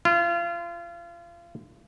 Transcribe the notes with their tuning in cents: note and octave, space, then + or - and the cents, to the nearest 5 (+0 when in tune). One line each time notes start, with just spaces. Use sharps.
F4 -30